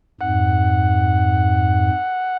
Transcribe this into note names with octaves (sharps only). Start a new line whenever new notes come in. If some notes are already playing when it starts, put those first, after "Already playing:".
F2 G#2 F#5